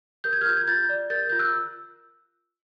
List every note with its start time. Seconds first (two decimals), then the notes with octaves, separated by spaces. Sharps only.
0.24 A#4 G6
0.33 G#6
0.41 F6 G6
0.46 F4
0.57 G#6
0.67 F4 G6 A6
0.89 D5
1.10 A#4 G6 A6
1.29 F4 G6
1.39 E6 F#6